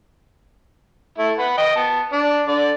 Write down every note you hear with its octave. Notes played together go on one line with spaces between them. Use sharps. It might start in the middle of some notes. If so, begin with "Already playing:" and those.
A3 E4
B4 F#5
D#5 G5
B3 A5
D4
D3 D5